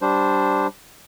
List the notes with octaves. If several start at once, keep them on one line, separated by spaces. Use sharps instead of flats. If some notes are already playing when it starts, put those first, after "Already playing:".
G3 D4 C5